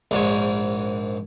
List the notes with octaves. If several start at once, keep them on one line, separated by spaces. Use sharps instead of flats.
A#1 G#2 C#5